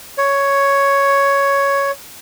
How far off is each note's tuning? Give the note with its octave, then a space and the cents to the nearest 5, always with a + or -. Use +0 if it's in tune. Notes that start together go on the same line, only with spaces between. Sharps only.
C#5 +5